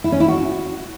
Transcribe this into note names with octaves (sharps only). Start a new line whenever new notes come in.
E4
C#4
E4
F#4